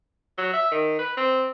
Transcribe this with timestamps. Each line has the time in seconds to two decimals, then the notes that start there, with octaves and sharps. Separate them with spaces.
0.38 F#3
0.53 E5
0.71 D#3
0.99 B4
1.17 C4